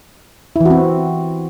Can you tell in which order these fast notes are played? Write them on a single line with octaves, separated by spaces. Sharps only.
E4 E3 F#4 C4